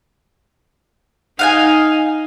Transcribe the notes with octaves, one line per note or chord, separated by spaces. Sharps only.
D#4 F5 F#5 G#5